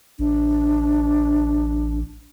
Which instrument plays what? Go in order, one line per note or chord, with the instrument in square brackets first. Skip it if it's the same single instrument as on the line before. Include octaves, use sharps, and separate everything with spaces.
[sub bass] A1 [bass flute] D4